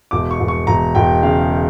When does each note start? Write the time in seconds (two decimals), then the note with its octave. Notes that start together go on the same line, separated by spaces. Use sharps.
0.11 E1 D6
0.31 C#6
0.40 E1
0.48 C#6
0.67 E1 A#5
0.95 E1 G5
1.23 C#3 F5